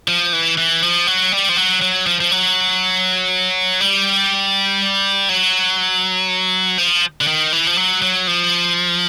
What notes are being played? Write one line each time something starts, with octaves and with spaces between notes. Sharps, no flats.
F3
E3
E3
F3
F#3
G3
F3
F#3
F#3
F3
F3
F#3
G3
F#3
F3
D3
D#3
E3
F3
F#3
F#3
F3